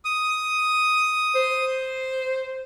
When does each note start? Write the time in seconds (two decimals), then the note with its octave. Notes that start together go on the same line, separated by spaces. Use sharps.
0.05 D#6
1.35 C5